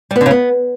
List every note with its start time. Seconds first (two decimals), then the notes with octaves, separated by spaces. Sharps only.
0.11 G3
0.16 B3
0.21 D3
0.26 C#3
0.31 B3